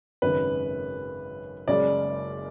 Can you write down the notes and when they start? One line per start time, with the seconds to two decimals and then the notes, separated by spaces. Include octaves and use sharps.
0.22 G#1 F#2 C#3 B4
1.68 F#1 F#2 C#3 G#3 D5